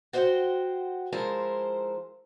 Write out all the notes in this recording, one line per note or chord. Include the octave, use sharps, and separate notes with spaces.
F#4 C5 D5 E5 F#5 G5
F3 G#3 E4 A#4 C5 A5